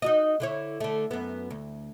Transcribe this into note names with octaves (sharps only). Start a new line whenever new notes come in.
D#4 F#4 D#5
D3 E4 C#5
D3 A3
F#2 B3
D2